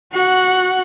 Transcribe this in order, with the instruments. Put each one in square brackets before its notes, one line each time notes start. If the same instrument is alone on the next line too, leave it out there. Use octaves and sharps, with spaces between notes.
[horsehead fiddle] F#4 F#5